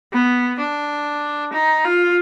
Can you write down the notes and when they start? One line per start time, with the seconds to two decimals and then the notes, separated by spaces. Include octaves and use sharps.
0.13 B3
0.59 D4
1.53 D#4
1.84 F4